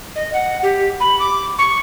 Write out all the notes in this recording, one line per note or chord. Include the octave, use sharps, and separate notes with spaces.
D#5
F#5
G4
B5
D6
C#6